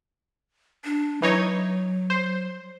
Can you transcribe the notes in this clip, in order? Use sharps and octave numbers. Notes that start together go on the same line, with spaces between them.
D4
E3 F#3 D#4 C#5
C5